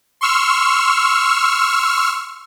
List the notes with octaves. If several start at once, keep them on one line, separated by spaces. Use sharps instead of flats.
C6 C#6 E6 F6